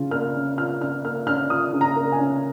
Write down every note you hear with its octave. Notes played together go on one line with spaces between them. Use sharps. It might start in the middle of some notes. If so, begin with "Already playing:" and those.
Already playing: C#3 F4
A#3 F6
C#4
F4 F6
C#3 F6
A#3 F6
C#4 F6
F4 D#6
C#3
A#5
A#3
G#5
C#4